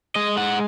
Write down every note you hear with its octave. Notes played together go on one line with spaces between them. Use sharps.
G#3 D#5
F#5